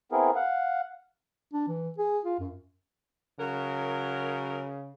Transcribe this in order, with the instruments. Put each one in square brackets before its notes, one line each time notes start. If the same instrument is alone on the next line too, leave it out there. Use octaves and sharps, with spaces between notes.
[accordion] B3 C4 E4 G#4 A#4
F5 F#5
[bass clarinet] D4
E3
G#4
F4
F#2
[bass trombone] C#3 [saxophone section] F#3 A#4